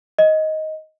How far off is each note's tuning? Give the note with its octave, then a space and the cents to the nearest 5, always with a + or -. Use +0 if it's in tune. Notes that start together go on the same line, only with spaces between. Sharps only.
D#5 +10